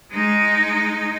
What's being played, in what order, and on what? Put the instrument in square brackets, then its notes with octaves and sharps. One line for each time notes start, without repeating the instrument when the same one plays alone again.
[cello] G#3 D#4